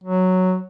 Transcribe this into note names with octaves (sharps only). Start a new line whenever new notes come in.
F#3